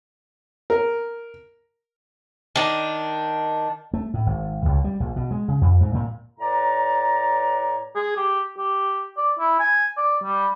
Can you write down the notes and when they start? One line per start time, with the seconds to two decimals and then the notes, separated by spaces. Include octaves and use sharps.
0.70 A#4
2.56 D#3 D4
3.94 A3
4.14 A2
4.26 G#1
4.65 C#2
4.84 G3
5.00 A#1
5.16 B2
5.31 G#3
5.48 C#3
5.61 F2
5.81 G#2
5.94 A#2
6.39 A2 B4 C#5 D5 A#5
7.96 G#4
8.17 G4
8.57 G4
9.17 D5
9.39 E4
9.60 G#5
9.97 D5
10.24 G3